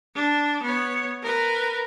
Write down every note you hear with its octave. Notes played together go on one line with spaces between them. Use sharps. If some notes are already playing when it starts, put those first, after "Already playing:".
D4
B3 C#5
A#4 B4